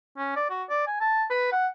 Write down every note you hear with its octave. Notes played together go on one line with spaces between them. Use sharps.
C#4
D5
F#4
D5
G#5
A5
B4
F#5